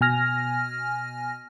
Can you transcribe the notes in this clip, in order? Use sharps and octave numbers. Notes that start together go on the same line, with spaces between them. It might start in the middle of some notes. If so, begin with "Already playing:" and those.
B2 G#5 F6 A#6